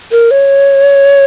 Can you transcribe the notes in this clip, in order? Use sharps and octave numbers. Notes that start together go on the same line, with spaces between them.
A#4
C#5